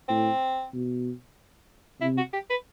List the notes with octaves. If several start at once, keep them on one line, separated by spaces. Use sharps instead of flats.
A2 C4
B2
C3 E4
F#4
G4
B4